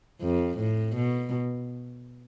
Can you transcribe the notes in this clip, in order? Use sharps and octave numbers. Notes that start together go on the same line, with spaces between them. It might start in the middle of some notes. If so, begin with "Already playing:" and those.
F2
A2
B2